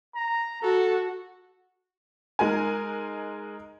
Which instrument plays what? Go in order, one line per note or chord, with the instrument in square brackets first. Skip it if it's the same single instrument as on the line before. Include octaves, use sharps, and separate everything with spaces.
[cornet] A#5
[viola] F#4 [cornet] A4
[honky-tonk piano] G#3 D#4 A#4 G#5